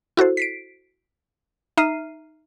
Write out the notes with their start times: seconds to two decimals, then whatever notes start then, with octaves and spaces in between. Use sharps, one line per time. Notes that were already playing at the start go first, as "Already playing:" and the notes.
0.17 E4 F#4 A4 C5
0.37 B6 C7 D7
1.77 D#4 E5 A#5 F6 C7 D#7